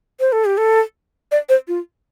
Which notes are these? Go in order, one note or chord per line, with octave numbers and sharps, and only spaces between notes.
C5
A4
G4
A4
D5
C5
F4